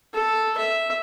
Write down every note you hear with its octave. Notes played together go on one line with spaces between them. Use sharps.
A4
E5